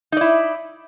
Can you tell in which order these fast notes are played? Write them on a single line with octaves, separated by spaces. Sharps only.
D#4 D5 E4